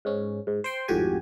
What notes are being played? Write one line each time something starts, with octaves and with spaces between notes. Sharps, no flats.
G#2 C#4
G#2
C5 G5 C6
G#1 F2 A2 F#4 G4 G#5